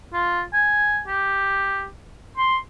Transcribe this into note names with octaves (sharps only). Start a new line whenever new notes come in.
F4
G#5
G4
C6